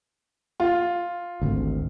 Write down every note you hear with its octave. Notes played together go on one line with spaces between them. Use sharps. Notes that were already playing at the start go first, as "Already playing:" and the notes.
F4
G#1 D2